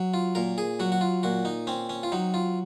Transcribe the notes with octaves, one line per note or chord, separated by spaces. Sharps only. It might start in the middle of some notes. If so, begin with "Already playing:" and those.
Already playing: F#3
F4
A#2 A#4
G#4
F#3 F#4
F#4
F4
A#2 F#4
D#4
C4 C#4
C#4
F4
F#3 D#4
F4